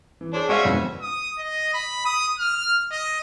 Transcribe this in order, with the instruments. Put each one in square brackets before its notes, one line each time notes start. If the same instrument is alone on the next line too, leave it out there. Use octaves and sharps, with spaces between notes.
[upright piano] E3
[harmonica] D4 [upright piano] G#4 C5 C#5
[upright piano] G#3 D5 F5 [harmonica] C#4 F#4 E5
[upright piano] F2 B2 D3
[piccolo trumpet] D#6
D#5
B5
D#6
F6
D#5